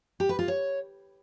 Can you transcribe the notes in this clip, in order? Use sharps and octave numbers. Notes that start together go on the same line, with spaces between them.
G4
B4
F4
C#5